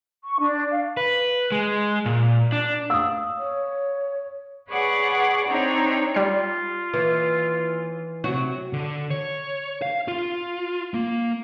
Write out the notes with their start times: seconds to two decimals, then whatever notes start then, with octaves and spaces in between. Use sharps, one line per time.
0.24 C#6
0.39 D4
0.71 F5
0.97 B4
1.52 G#3
2.06 A#2
2.52 D4
2.90 F5 D#6 E6
3.38 C#5
4.71 G#4 B4 C#5 D5 F#5
5.48 C4 D4 D#4 C#5 A#5
6.14 G3 F4 C7
6.93 D#2 E3
8.24 C3 F#3 F#4
8.73 D3
9.10 C#5
9.82 F5
10.08 F4
10.94 A#3